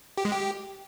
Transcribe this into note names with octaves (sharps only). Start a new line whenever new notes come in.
G4
G#3
G4